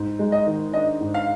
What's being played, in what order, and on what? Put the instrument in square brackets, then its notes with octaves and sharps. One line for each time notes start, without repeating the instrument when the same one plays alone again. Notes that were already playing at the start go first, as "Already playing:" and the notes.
Already playing: [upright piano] G#2
G#3
[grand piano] D#5
[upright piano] D#3
[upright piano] D4 [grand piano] D#5
[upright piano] G#2
[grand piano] F5